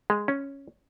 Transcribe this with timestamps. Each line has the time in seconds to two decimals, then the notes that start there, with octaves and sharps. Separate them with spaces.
0.10 G#3
0.28 C#4